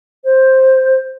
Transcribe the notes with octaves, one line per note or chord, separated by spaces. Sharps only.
C5